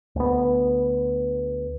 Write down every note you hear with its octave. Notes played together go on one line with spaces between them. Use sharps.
D2 B3